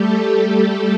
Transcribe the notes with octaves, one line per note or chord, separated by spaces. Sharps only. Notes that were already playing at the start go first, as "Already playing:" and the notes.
Already playing: G3 A3 G4 A4
A3 A4